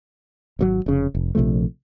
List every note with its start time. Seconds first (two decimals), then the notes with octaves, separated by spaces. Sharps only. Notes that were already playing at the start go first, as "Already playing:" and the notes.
0.59 G#1 B2 F#3
0.86 F1 C#3
1.15 F1
1.35 A#1 C3 F3 A3